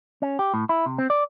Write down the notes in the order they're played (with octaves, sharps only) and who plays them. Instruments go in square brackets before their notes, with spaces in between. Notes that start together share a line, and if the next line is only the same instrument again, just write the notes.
[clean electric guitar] C#4
G4
A2
E4
C3
C4
D5